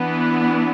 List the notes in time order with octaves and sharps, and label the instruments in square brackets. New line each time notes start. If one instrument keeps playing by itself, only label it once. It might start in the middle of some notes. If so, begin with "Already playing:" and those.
Already playing: [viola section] E3 B3 D4